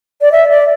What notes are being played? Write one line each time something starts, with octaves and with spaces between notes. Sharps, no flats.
D5
E5
D5